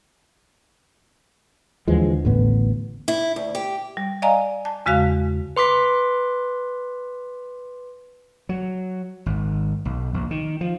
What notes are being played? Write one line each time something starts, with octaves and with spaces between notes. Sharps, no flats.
D#2 D3 E3 F3 G#3
A1 A2 B3
E4
D2
G4
G3
D5 D#5 F5 G#5 A#5
A5
E2 C#3 G#3 F#4 F5
B4 C6 D6 B6
F#3
G#1
B1
A#1
D#3
F3